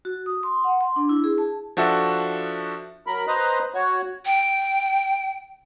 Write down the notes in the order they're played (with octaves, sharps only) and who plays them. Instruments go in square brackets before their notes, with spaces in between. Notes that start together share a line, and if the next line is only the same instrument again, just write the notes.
[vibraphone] F#4
D#6
C6
F#5
C6
D4
E4
G#4
A5
[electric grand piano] F3 D4 F#4 A4 E5
[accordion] F#3 A#4 B5
B4 C5 D#5 A#5
F#4 C#5
[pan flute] G5